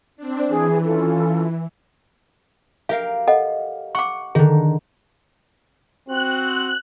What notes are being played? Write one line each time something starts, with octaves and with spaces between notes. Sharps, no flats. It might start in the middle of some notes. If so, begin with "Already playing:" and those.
C4 D4
E3 G#4
C#4 F4 A4
G4 A#4 E5 F5
A4 D#5 F#5
F#5 C#6 D6
D3 D#3 G#4
C4 F#4 F#6